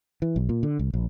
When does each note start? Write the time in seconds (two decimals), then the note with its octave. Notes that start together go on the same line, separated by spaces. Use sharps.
0.22 E3
0.36 B1
0.49 A#2
0.63 D3
0.79 C2
0.94 A#1